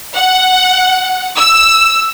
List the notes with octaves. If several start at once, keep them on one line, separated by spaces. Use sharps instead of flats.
F#5
E6